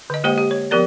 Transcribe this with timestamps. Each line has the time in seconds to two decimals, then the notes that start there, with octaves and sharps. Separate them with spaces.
0.10 D3 D#5
0.24 G#3 A#3 G4 C5 D#5 G5
0.38 G4
0.51 C#5
0.71 F3 B3 G4 A#4 D5